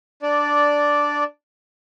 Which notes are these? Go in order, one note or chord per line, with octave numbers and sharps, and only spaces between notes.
D4 D5